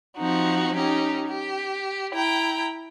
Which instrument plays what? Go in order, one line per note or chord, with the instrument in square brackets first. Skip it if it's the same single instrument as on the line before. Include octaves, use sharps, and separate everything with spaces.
[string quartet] F3 C4 D#4 F#4
C#4 D#4 G4
G4
E4 G5 A#5